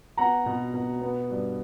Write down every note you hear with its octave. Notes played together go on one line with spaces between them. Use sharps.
B3 F#5 A#5
B2
B2
B3
G2